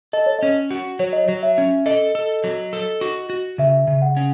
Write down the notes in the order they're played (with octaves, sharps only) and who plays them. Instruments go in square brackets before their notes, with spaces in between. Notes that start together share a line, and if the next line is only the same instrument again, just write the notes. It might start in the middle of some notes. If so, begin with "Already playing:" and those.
[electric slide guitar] A4 [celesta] D#5
[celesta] C#5
[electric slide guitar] C#4 [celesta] D#5
[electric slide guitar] F#4
[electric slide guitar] F#3 [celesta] C#5
[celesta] D#5
[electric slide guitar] F#3 [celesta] C#5
[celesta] E5
[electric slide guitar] C#4
[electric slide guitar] A4 [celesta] D#5
[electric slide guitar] A4
F#3
A4
F#4
F#4
[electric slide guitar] C#3 [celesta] E5
[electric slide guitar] C#3
[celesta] F#5
[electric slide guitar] C#4